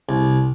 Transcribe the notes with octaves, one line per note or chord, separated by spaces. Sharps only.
C2